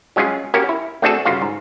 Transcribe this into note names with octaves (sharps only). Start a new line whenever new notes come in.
F#3 G#3 C#4 F4 G#4
A#3 C#4 F#4 G4 A#4
E4
A3 C4 D4 F#4 G#4 A4
G1 C#3 F4 F#4 F5
G#2